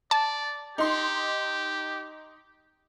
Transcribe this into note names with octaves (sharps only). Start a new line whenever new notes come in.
D5 A5
D#4 G4 C6